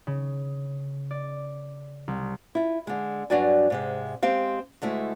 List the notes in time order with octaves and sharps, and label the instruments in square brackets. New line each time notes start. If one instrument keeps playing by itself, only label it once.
[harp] C#3
D5
C2
[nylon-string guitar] E4 F4
D3 G#3
G2 F#3 D4 F#4 D5 G#5
G#2 C3 G#3
G#3 C4 G4 F5
D2 G#3 A3 E4